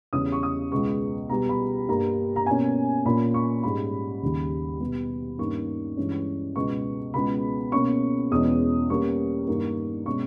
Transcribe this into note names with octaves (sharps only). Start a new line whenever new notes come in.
E2 C#3 E3 G3 C#4 D#6
C#6
D#6
C#2 B2 G#3 B3 C#6
B2 G3 B3 A#5
B5
G2 G3 A#3 A#5
A#5
B2 A#3 C#4 G#5
A#2 A#3 C#4 B5
C#6
G#2 G3 C#4 B5
D#2 C#3 G3
B2 G3 B3
G2 D#3 A#3 C#4 C#6
G2 E3 G#3 C#4
C#2 B2 G#3 B3 C#6
C#2 B2 G#3 B3 B5
B2 A#3 C#4 C#6
E2 B2 G#3 C#4 D#6
B2 G3 A#3 C#4 C#6
G2 D#3 A#3
B2 G#3 C#4 C#6